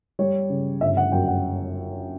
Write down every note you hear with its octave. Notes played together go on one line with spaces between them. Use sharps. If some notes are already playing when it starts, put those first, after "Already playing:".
G3 C#5
C#3
G1 E5
F#5
F#2 G5
F#5